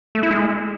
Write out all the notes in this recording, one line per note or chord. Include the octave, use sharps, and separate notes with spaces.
A3
E4
G#3